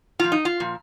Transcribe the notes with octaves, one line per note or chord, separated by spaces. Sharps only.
A#2 F3 F4
D#4
F4
A#2 F3